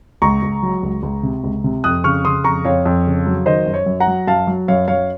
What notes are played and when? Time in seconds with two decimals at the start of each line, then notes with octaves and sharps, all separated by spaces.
0.22 C#2 A#5 C#6
0.43 C#2
0.63 F#3
0.83 C#2
1.03 C#2
1.23 C3
1.44 C#2
1.64 C3
1.84 F2 D#6 F#6
2.04 C#3 C#6 F6
2.25 C#3 C6 D#6
2.44 F2 A#5 C#6
2.65 F2 C#5 F5
2.85 F2
3.06 C#3
3.26 F#3
3.46 D#3 C5 D#5
3.66 F#2
3.74 C#5
3.86 F#2
4.00 F#5 A#5
4.07 F#3
4.27 F#2 F5 A5
4.47 F#3
4.68 F#2 C#5 F5
4.88 F#2 C#5 F5